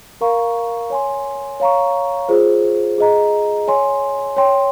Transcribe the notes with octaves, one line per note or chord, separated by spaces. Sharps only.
A#4 F5 A#5 C#6
C#5 G#5 C6
C#5 F5 A#5 C#6
F4 G#4 C5
G#4 D#5 A#5
C#5 G#5 C6
C#5 G5 C6